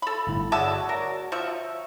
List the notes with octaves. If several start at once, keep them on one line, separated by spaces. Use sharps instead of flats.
A4 B5
G1 A2
F#4 G#4 C#5 D5 E5 A5
A#4
F3 E5 C#6